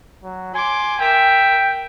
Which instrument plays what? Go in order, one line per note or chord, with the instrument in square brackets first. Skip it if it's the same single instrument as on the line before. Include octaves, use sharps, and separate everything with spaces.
[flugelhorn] F#3
[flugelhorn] G#5 [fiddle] C6 D6
[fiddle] A#4 E5 [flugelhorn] G5